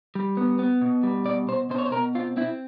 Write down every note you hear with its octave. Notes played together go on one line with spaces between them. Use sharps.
G3
B3
B3
B2
G3
B2 D5
B2 C5
B2 C5
C#5
C5
B2 A#4
C4 F4
C4 E4